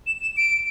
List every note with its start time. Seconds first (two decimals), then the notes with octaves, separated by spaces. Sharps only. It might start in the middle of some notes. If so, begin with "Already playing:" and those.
0.07 E7
0.22 E7
0.37 D7